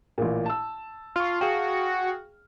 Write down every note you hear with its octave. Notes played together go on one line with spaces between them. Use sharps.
A1 A#2
A5 E6
F4 C#6 F6
F#4 G#4 F5 G5